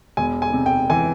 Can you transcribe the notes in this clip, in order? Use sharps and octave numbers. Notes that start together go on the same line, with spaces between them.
E1 G#5
G#5
C3
G5
E3 G#5